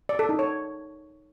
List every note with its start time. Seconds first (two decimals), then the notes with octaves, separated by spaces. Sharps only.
0.09 D5
0.19 A4
0.29 D#4
0.39 C#5